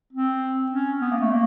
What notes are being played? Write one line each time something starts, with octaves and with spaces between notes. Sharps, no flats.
C4
C#4
B3
A#3
A3
A#3